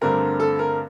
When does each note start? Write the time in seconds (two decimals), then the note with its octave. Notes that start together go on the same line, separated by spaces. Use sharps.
0.01 G2 D3 A3 C4 A#4
0.40 A4
0.59 A#4